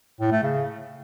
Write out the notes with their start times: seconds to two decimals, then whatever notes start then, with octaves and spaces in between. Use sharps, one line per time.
0.20 A2
0.31 A3
0.43 C#3